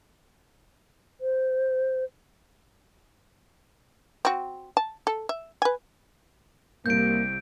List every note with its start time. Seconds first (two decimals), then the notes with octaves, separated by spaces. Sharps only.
1.21 C5
4.25 C4 F#4
4.77 A5
5.07 A4
5.29 E5
5.62 B4 G#5
6.86 C2 A#3 G6 D7